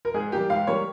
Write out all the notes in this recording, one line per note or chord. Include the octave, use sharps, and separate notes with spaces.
A#4
G#2 G#4
G3 A#3 G4
G#2 F5
G3 A#3 C#5